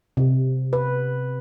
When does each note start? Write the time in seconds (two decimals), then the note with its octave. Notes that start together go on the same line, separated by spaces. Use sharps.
0.17 C3
0.73 B4